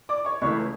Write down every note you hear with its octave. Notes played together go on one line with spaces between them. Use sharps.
D5 D6
C#5 C#6
C#2 C#3 E3 A3 C#5 C#6